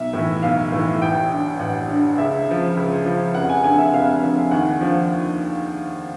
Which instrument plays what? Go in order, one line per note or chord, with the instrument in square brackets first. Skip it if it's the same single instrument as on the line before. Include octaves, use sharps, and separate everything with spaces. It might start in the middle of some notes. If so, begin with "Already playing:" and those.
Already playing: [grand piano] B1 E5
A2 E3
B1 F5
A2 E3
A1 G5
G2 D3
A1 F#5
G2 D3
C#2 E5
C#3 F3
C#2
C#3 F3
F1 F#5
G#5
F2 D3 G#5
E5
F1 F5
F2 D3
D#2 F#5
D3 F3